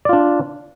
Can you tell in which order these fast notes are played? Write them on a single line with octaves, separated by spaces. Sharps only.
D5 F4 D4